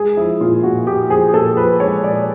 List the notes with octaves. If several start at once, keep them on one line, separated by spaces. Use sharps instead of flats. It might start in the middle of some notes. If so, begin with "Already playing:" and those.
Already playing: G#3 G#4
F3 E4
A#2 F4
A#2 F#4
A#2 G4
F3 G#4
A#2 A4
F3 B4
G#3 C#5
A#2 D5